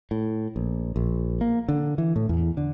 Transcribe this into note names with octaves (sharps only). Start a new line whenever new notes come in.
A2
A#1
A#1
A#3
D3
E3
A2
E2
D3